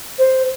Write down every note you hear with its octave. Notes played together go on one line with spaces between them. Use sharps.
C5